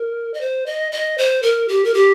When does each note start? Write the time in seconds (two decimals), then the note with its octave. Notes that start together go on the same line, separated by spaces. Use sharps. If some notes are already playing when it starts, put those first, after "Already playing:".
Already playing: A#4
0.34 D#5
0.41 C5
0.66 D#5
0.92 D#5
1.18 C5
1.43 A#4
1.68 G4
1.84 A#4
1.94 G4